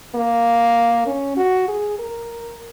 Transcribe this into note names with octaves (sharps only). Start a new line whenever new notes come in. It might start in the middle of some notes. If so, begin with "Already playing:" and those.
A#3
C#4
F#4
G#4
A#4